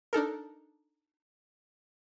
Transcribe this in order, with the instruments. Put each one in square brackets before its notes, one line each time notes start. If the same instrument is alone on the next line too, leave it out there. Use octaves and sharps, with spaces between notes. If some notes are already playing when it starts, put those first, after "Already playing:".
[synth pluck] D4 D#4 A4 A#4